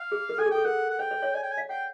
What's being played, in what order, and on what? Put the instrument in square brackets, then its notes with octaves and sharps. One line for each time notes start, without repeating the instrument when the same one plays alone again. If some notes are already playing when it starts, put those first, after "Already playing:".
Already playing: [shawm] F5
[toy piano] G#4
A#4
[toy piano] A4 [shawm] G#5
[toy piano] G#4
[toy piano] A4 [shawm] G5
[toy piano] A#4 [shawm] F#5
[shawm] F#5
[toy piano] C5 [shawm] G5
[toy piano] C5
C#5
[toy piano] D5 [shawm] G#5
[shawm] G5
G#5
[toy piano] F5
[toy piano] F#5 [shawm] G5